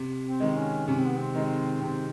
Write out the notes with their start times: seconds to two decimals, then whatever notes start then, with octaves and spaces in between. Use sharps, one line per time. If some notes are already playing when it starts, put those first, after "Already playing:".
Already playing: C3
0.24 C4
0.40 D#3 G#3
0.56 C#4
0.87 C3 C#4
0.98 C4
1.07 B3
1.18 C4
1.35 D#3 G#3
1.82 C3 C4